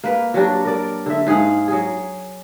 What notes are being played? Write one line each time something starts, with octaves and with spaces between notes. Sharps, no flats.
A#3 B4
F#3 G3 D4 F#4
A#4 D5
D3 E5
G#2 G#4 F5 F#5
F#3 G#4